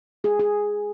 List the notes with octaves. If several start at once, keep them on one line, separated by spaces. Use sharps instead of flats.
G#3 G#4
G#3 G#4